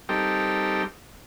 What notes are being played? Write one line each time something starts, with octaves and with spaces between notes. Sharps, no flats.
G3 C4 D#4 G4 A4 A#4